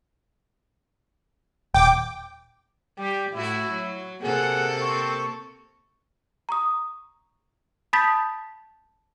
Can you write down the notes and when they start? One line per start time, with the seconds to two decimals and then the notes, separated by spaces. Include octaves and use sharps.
1.74 D#1 G5 D6
2.98 G3 G4
3.32 A2 E4 F#4
3.71 F#3
4.22 C3 A#3 G#4 A4 F#5
4.81 C4 C#6
6.49 A#5 C#6 D#6
7.93 A5 B5 D#6 G6 A6 B6